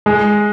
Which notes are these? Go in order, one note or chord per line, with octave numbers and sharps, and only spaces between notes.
G#3